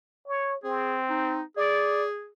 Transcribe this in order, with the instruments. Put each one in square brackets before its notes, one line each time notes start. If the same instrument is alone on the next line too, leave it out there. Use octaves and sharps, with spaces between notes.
[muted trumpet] C#5
[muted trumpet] C4 [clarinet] G#4
[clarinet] D#4
[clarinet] G#4 [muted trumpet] D5